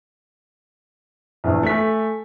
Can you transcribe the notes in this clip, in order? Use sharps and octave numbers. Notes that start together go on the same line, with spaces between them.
A#1 E2
A3 G#5 B6